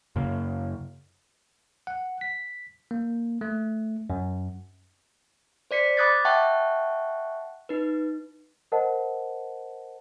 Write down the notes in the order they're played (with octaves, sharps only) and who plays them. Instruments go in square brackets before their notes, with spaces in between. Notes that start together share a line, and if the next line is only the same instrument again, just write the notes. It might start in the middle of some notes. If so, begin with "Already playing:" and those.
[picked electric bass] F#2 C#3 A#3
[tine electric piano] F#5
B6
A#3
A3
F#2
[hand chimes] C5 D5 B6 C#7
B5 D6 D#6 F#6 G#6 A6
E5 F#5 G5 A5 C#6 F#6
D#4 B4
[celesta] A#4 C5 D#5 F#5 A5